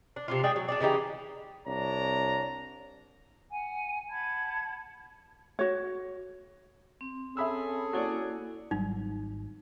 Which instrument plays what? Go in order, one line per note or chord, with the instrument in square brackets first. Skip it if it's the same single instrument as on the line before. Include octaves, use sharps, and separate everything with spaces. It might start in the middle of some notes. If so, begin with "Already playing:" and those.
[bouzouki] D4
C3 D4 F4
G#3 D4 G#4 G5
F#3
D4 G#4 D5
C#3 E3 D#4 G4
[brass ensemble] C2 D4 C#5 A#5
[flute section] F#5 G#5
F#5 A5 B5 G#6
[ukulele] F#4 C#5
[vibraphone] C4
[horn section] C#4 G#4 A4 [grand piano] E5 B5 E6
[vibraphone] A#3 E4 [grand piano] F#4 C#5 D5
[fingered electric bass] G#1 [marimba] F#3 G3 [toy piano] D#4